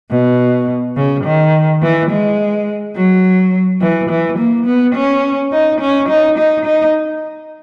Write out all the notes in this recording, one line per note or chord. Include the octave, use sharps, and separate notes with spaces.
B2
C#3
D#3
E3
G#3
F#3
E3
E3
A#3
B3
C#4
D#4
C#4
D#4
D#4
D#4